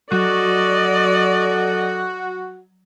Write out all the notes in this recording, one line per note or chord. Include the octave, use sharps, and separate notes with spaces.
F#3 F#4 A4 D5 D#5